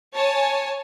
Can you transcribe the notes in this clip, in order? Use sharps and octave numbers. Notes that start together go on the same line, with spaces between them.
C#5 G#5 A5